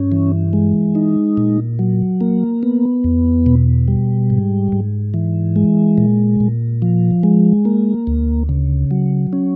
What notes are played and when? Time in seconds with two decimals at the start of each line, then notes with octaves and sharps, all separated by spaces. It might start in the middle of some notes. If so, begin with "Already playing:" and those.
Already playing: G2 C#4
0.12 E3
0.53 G#3
0.95 D#4
1.37 A#2
1.79 F#3
2.21 A#3
2.63 B3
3.04 E2
3.46 B2
3.88 G3
4.30 G#2
4.72 G#2
5.14 E3
5.56 G#3
5.98 A#2
6.40 A#2
6.82 F3
7.23 G#3
7.65 A#3
8.07 D2
8.49 C#3
8.91 F#3
9.33 C#4